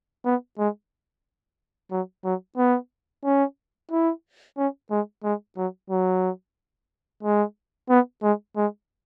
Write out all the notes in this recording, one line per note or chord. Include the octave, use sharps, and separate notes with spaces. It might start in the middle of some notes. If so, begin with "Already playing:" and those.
B3
G#3
F#3
F#3
B3
C#4
E4
C#4
G#3
G#3
F#3
F#3
G#3
B3
G#3
G#3